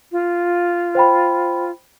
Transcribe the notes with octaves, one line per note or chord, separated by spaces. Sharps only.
F4
C5 G5 B5